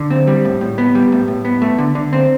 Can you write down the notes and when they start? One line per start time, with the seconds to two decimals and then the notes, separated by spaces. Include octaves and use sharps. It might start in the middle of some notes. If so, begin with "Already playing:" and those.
Already playing: D3
0.10 C4
0.27 G3
0.45 A2
0.61 A2
0.78 B3
0.95 G3
1.12 A2
1.28 A2
1.45 B3
1.62 A3
1.78 D3
1.95 D3
2.13 C4